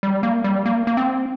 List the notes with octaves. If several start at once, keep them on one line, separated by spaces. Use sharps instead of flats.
G3
A#3
G3
A#3
A#3
C4